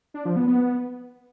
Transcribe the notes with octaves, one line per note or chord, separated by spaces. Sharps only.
D4
F3
B3
B3